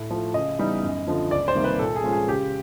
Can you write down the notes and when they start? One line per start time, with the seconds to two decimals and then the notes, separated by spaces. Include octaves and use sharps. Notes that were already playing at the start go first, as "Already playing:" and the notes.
Already playing: A2
0.11 F3 A3
0.34 C#3 D#5
0.59 E3 G3 B3 D#4
0.83 F#2
1.07 D3 F3
1.31 C#2 D5
1.48 C5
1.55 C3 D#3 G3 A#3
1.64 B4
1.79 A#2 A4
1.96 G#4
2.04 F3 G#3 C#4
2.12 G#4
2.28 C#3 G4